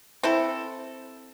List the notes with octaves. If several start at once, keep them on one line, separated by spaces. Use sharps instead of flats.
C4 E4 A4